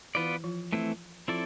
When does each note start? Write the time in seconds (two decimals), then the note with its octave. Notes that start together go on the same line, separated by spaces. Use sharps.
0.15 E3 B3 E4 F4 B4 D5
0.44 F3 F4
0.73 E3 A3 C4 E4
1.28 F3 C4 E4 F4 A4 D5